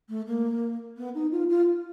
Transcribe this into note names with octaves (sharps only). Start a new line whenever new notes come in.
A3
A#3
B3
D#4
F4
F4